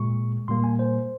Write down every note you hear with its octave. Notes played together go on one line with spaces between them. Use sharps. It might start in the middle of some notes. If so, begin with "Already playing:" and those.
Already playing: A#2 G#3 C#6
A#2 G3 A#3 C6
G#5
C5